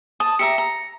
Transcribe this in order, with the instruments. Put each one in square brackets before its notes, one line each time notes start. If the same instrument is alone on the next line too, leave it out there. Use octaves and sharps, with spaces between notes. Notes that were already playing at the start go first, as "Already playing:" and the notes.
[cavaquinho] A5 [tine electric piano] D#6
[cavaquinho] G4 E5 A#5 [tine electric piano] C#7
[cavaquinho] A#5